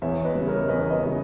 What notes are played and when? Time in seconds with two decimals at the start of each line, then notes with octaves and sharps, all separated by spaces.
0.02 E2 C#5 E5
0.24 B4 D#5
0.35 C#3 G3
0.47 A#4 C#5
0.68 E2 B4 D#5
0.90 B4 D#5
1.02 C#3 G3